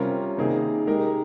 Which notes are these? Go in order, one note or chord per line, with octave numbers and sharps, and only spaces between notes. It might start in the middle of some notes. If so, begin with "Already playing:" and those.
Already playing: C3 G3 C#4 F4 A#4
C3 D#3 A#3 D#4 G#4
G#3 D#4 G4 A#4